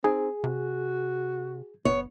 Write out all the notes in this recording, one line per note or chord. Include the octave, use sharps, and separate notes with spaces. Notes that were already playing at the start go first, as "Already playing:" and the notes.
C4 D#4 G#4
C3 F#4
F#1 B3 C#5